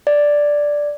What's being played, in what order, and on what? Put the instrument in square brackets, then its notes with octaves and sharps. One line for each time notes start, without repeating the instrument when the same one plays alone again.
[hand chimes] D5